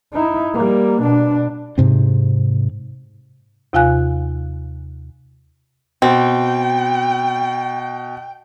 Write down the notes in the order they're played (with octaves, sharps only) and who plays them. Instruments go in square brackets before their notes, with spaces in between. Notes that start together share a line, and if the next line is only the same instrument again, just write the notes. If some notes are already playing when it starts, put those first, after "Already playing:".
[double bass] D#4 E4
G3 A#3
B2 D4
[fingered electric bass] G#2 C3 C4
[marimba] D#2 C3 F4 F5 G#5 F#6
[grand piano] B2 [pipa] C4 [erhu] G5